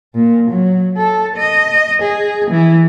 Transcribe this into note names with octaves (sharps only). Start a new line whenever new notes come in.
A#2
F#3
A4
D#5
G#4
E3